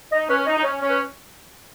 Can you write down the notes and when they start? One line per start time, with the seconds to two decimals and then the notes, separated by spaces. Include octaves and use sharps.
0.12 D#4 D#5
0.29 C#4 B4
0.47 D#4 D#5
0.57 D#4
0.63 C#4 C#5
0.81 C#4
0.90 B4